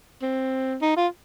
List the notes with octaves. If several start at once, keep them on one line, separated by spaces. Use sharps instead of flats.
C4
D#4
F4